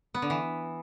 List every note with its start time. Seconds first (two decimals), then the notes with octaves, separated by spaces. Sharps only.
0.14 B3
0.22 D3
0.30 E3